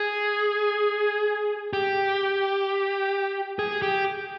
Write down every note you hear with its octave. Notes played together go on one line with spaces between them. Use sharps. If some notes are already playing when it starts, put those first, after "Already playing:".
Already playing: G#4
G4
G#4
G4